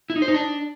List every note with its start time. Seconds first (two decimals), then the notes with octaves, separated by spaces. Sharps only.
0.10 E4
0.16 D#4
0.22 C5
0.28 D#4
0.34 D4